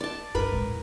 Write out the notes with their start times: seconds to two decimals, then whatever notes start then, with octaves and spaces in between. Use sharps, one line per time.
0.01 D5 A5
0.35 G2 A#4 B4 B5
0.52 G#2 C#3
0.64 E2